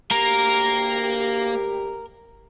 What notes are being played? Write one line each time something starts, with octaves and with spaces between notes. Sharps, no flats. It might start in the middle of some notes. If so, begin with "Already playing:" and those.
D2 A#3 G4 A#4